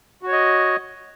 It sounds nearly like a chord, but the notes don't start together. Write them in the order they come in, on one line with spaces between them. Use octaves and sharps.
F#4 C#5 D#5